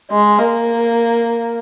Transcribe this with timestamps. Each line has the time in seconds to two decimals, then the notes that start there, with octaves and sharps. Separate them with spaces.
0.11 G#3
0.39 A#3